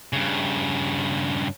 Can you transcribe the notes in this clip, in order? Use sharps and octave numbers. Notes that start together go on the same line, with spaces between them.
G2 C#3